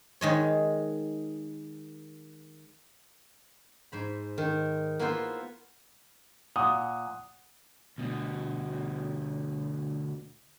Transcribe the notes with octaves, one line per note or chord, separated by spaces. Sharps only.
D#3 G#3 C#5
G#2 C5 B5
D#3
A#3 B3 E4 F4 B4 C5
A#2 F#5 D#6
D2 B2